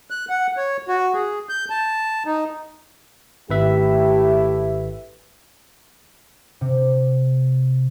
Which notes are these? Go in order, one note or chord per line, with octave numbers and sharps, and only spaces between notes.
F#6
F#5
C#5
F#4
G#4
G6
A5
D#4
G#1 A3 E4 G4 B4 E5
C3